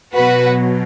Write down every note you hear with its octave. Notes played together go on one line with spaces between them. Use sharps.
B2 F#3 F#4 B4